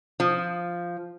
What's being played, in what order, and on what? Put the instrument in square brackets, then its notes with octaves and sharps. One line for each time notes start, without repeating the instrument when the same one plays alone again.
[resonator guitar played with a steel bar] F3